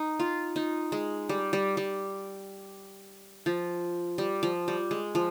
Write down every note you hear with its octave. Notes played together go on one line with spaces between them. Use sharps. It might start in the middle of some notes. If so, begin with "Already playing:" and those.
Already playing: D#4
F4
D#4
G#3
G3
G3
G3
F3
G3
F3
G3
G#3
F3